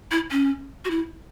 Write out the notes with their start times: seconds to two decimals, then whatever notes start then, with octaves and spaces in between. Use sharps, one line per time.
0.11 E4
0.31 C#4
0.85 F#4
0.91 E4